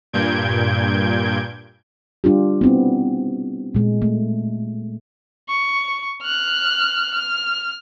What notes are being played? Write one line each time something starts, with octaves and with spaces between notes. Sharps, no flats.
G2 A#2 G6 G#6 D7
G3 D4 F4 G4
B3 C4 E4
A#2 G#3
A3
C#6
F6 F#6
F6